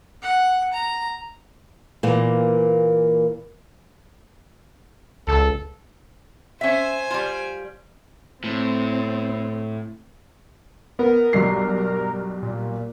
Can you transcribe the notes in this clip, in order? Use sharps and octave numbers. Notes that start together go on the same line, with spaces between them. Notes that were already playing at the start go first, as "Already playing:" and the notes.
F#5
A#5
A#2 E3 A#3
C#2 A4
C#4 C5 E5 G#5
G3 F4
A2 C4
B3 A#4
B1 G2 C7
A#2